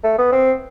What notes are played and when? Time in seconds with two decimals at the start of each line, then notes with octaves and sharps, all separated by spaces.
0.04 A3
0.18 B3
0.32 C4